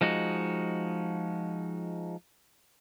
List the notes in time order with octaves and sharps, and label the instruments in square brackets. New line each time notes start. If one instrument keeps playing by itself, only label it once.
[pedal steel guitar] F3 G#3 D#4 F#4